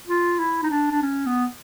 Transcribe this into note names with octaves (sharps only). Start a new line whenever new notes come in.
F4
E4
D#4
D4
D4
C#4
B3